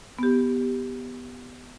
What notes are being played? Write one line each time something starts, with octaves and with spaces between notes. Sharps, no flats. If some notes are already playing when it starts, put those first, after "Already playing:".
B3 G4